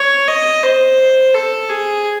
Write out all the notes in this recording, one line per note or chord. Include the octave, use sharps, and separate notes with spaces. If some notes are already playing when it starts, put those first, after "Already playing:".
Already playing: C#5
D#5
C5
A4
G#4